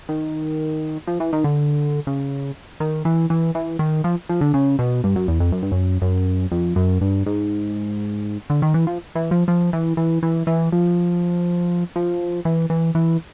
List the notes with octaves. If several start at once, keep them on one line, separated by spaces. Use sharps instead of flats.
D#3
F3
E3
D#3
D3
C#3
D#3
E3
E3
E3
D#3
F3
F3
D3
C#3
B2
G2
F#2
E2
F2
F#2
G2
F#2
F#2
F2
F#2
G2
G#2
D3
D#3
E3
F3
E3
F3
F3
E3
E3
E3
E3
F3
F3
E3
E3
E3